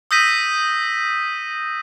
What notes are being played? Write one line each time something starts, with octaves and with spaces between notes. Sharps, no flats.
D#6 E6 G6 A#6 B6 D#7